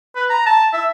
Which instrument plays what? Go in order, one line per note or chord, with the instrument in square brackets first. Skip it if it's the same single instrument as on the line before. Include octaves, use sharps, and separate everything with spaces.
[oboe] B4
A#5
A5
E5